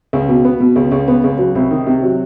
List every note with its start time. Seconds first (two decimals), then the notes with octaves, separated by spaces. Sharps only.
0.13 C#2
0.29 B2
0.45 B3
0.60 B2
0.76 C#2
0.92 C#2
1.08 B3
1.24 C#2
1.39 F#3
1.55 C2
1.71 D#3
1.87 C3
2.03 F#3